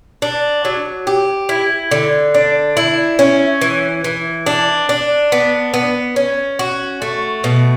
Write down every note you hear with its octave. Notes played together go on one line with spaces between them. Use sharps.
D4
F#3
G4
E4
D3
D4
E4
C#4
E3
E3
D4
D4
B3
B3
C#4
F#4
A3
B2